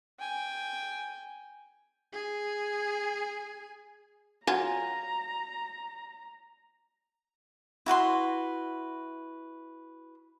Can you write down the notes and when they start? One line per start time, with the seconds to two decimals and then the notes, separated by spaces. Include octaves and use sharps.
0.19 G5 G#5
2.12 G#4 G#5
4.47 F#3 F4 G#5 A#5
7.86 E4 F#4 B4 C6